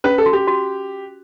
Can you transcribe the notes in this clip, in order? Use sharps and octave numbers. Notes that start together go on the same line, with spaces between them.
C#4 B4
A4
F#4
G4
F#4